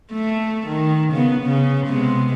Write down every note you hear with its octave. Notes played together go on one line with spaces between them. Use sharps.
A3
D#3
C#3 B3
C#3
C3 G#3 B3